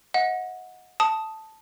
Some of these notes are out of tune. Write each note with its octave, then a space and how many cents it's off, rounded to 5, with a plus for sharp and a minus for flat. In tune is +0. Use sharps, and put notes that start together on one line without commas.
D#5 +30 F#5 -20
A5 +0 D#6 +5